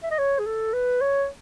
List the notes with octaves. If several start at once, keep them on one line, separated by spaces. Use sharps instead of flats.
E5
D#5
C#5
G#4
A4
B4
C#5